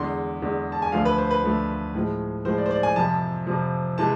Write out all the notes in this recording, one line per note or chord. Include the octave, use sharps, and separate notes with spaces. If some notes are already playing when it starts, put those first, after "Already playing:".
Already playing: E2 D3 G#3 C6
E2 D3 G#3
A5
G#5
D2 D3 F3 A3 F5
B4
C5
B4
D2 D3 F3 A3
A2 F3 G#3
A2 F3 G#3 C5
D5
C5
D5
G#5
F2 C3 F3 A5
F2 C3 F3
C3 E3 G#3 A5